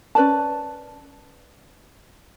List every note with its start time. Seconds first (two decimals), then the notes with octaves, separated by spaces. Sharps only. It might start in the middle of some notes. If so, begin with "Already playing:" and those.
0.15 C#4 B4 D5 A5